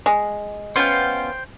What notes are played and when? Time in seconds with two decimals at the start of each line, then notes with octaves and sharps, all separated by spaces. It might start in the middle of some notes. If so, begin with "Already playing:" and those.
0.06 G#3
0.76 B3 C#4 F4 C5 G5